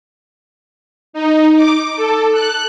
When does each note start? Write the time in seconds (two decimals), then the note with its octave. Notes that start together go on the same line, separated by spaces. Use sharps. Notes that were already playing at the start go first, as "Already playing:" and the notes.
1.13 D#4
1.56 D6
1.96 A4
2.32 F#6